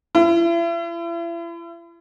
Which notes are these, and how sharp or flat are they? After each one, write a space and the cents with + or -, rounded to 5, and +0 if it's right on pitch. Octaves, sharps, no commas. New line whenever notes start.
E4 +40